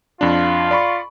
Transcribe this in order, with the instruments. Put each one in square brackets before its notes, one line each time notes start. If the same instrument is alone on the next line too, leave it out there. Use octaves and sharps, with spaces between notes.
[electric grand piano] F2 D4 [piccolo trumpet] F4
[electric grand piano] D5 B5 C#6